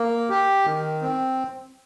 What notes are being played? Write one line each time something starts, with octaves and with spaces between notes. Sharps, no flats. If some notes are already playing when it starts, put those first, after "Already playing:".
Already playing: A#3
G4
D#3
C4